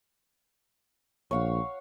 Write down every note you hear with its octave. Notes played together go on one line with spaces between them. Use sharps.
A#1 C#5 F5 F#5